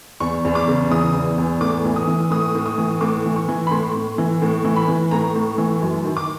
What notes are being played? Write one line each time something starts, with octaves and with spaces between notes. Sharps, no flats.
E2 C#6
E2
D6
C#3
E3 D#6
E2
E2
A2 D6
E3
D#6
E3
A2 D#6
A2
D#6
E3
A2 D6
E3
C#6
E3
B5
A2 C6
A2
E3
A2
E3
B5
E3
A2 A#5
A2
E3
F#2
D#3
D6